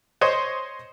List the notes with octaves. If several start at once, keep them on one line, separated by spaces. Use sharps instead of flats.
C5 C#5 D#5